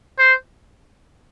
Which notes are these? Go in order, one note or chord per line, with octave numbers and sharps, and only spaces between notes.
C5